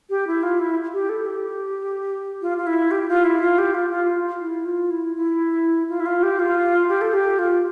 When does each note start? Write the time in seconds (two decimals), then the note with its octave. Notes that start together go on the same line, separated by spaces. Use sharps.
0.10 G4
0.27 E4
0.43 F4
0.59 E4
0.93 G4
1.09 A4
1.26 G4
2.42 F4
2.58 F4
2.67 E4
2.91 G4
3.09 F4
3.24 E4
3.41 F4
3.58 G4
3.74 F4
3.90 F4
4.41 E4
4.65 F4
4.91 E4
5.16 E4
5.89 F4
6.00 E4
6.06 F4
6.23 G4
6.39 F4
6.89 G4
7.01 A4
7.13 G4
7.39 F4